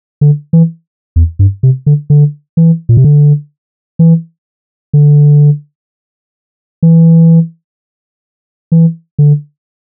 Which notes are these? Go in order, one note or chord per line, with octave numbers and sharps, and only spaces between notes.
D3
E3
E2
G2
C3
D3
D3
E3
A#2
C3
D3
E3
D3
E3
E3
D3